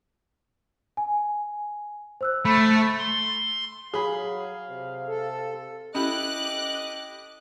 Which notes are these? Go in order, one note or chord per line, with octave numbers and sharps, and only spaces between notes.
G#5
C5 E6 F#6
A3 B5
C6
F#3 G#4 F5 B5
C3
A4
C#4 E4 G4 A4 D#5 D6 F#6